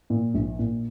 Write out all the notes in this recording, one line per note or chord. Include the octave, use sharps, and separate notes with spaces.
A#2
A#1
A#2